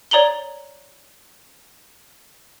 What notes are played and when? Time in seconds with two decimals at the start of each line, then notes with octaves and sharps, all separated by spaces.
0.11 C#5 D5 A#5 F#7 G7